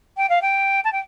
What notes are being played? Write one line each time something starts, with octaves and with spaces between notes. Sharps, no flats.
G5
F5
G5
A5
G5